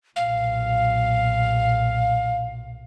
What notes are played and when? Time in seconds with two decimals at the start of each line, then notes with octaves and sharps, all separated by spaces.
0.16 B1 A#2 F5